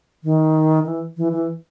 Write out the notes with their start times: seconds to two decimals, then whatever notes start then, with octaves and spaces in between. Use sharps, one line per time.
0.24 D#3
0.86 E3
1.17 E3
1.32 E3